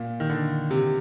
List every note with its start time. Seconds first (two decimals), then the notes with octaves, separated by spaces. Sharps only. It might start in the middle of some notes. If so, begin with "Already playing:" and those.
Already playing: A#2
0.20 D#3
0.30 D3
0.71 C3